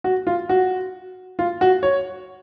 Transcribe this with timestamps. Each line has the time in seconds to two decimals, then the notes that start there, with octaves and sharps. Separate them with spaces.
0.04 F#4
0.27 F4
0.49 F#4
1.39 F4
1.61 F#4
1.83 C#5